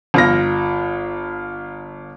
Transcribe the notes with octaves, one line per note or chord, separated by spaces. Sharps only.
G1 F4 A#6